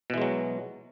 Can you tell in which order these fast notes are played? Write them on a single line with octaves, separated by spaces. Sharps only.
B2 E3 G#3 F#3